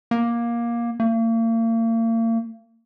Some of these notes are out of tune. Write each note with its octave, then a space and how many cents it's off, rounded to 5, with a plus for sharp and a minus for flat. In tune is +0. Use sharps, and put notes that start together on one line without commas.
A#3 +15
A#3 -40